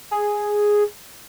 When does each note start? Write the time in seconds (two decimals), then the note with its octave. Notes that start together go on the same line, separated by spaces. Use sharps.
0.11 G#4